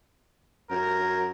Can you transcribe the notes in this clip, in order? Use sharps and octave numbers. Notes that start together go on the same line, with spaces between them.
F#2 A#4